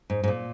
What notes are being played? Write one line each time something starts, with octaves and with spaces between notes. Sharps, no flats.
G#2
G#2
A#2